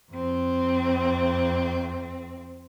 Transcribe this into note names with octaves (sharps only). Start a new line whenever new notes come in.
F2 C4